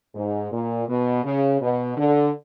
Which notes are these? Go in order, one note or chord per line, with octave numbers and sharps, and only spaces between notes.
G#2
A#2
B2
C#3
B2
D3